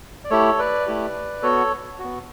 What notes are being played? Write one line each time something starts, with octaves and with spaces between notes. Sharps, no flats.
D5
A3 E4 G4 A4 C#5
B4 D5
A3 E4 G4
B3 F#4 A4 C#5
B3 F#4